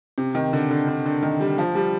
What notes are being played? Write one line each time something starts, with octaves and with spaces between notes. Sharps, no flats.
C3
D#3
D3
D3
D3
D3
D#3
G3
F3
G3